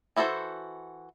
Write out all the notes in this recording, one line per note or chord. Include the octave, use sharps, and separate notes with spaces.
E3 E4 F#4 A4 C5